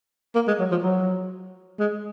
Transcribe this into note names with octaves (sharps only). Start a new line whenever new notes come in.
A#3
G#3
F#3
F3
F#3
G#3